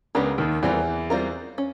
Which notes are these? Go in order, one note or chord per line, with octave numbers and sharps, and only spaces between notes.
C#2 C#3 G#3 B3 D4 G4 A#4
D#2 D#3
E2 E3 G3 C4 F4 A#4
G3 C4 F4 A#4
C#4